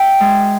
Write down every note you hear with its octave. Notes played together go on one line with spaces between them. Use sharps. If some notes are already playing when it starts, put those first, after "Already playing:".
Already playing: E5 G5
G#3